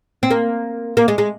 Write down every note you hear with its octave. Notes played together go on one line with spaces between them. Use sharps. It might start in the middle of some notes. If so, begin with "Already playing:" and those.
C4
A#3
A#3
G#3
G#3